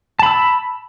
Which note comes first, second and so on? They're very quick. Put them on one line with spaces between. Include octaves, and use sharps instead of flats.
A5 B5 E6